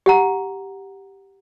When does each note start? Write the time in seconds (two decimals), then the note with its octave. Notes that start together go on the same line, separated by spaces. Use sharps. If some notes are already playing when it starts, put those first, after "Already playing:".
0.06 G4 F#5 A#5